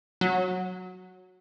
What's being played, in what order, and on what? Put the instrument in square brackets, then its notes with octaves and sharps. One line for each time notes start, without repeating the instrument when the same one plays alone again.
[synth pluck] F#3